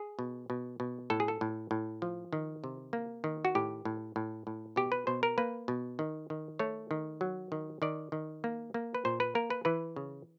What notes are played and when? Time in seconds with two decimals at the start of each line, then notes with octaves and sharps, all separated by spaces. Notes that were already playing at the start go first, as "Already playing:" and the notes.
Already playing: G#4
0.19 B2
0.50 B2
0.80 B2
1.10 A2 A4
1.20 G#4
1.28 A4
1.41 A2
1.71 A2
2.02 F3
2.33 D#3
2.64 C3
2.93 A#3
3.24 D#3
3.45 F#4
3.55 A2 G4
3.85 A2
4.16 A2
4.47 A2
4.76 B2 G4
4.92 B4
5.07 B2 C5
5.23 A#4
5.38 A#3 B4
5.68 B2
5.99 D#3
6.30 D#3
6.59 A3 C#5
6.91 D#3
7.21 F#3
7.52 D#3
7.82 D#3 D5
8.12 D#3
8.44 A#3
8.74 A#3
8.95 B4
9.05 A#2 C5
9.20 B4
9.35 A#3 A#4
9.50 B4
9.65 E3 B4
9.96 C#3